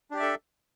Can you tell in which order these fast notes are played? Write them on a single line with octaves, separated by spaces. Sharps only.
D4 G4 D5 E5 A4